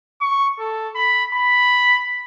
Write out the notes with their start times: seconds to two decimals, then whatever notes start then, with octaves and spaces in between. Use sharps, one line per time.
0.21 C#6
0.59 A4
0.95 B5
1.35 B5